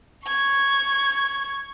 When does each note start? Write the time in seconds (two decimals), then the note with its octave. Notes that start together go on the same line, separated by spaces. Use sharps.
0.24 C#6 G#6